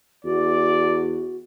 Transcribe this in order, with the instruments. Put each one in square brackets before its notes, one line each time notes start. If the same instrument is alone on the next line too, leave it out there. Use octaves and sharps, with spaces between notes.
[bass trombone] E2 [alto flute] F#4 [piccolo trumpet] D5